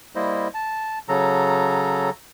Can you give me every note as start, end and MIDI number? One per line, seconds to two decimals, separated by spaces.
0.15 0.48 55
0.15 0.48 58
0.15 0.48 64
0.15 0.48 72
0.15 0.48 75
0.54 0.99 81
1.09 2.10 49
1.09 2.10 54
1.09 2.10 69
1.09 2.10 82